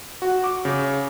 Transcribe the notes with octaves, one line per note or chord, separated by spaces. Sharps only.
F#4
D6
C#3